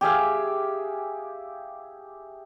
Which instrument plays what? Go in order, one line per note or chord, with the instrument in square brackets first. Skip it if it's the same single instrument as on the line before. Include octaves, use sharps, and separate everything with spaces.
[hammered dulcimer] G4 G#4 E5 F5